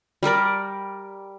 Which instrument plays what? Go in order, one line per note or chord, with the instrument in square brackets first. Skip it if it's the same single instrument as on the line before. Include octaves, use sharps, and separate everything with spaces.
[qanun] G3 G4 A#4 D5